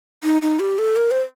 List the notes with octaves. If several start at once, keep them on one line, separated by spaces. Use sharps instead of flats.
D#4
D#4
G4
A4
A#4
C5